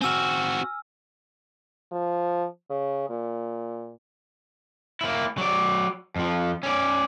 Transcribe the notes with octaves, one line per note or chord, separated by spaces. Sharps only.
C4 F#4 G#5 E6 F6
F3
C#3
A#2
A#3 E4
F#3 D5
F2 F3
C#4 D5